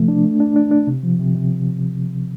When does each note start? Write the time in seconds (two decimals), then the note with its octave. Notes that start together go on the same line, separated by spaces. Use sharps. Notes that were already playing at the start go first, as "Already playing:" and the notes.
Already playing: C3 F3 A3
0.08 D4
0.24 A3
0.40 D4
0.56 D4
0.71 D4
0.87 C3
1.03 F3
1.19 C3
1.35 C3